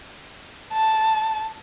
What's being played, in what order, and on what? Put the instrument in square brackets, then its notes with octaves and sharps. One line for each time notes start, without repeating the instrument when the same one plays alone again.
[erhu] A5